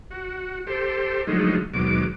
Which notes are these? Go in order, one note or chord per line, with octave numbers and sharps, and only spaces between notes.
F#4
G4 A4 C5
D3 F3 F#3 G#3 A3 D#4
D#2 G#2 B2 F#3 D6